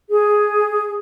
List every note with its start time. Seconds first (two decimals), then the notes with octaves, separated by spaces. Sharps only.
0.09 G#4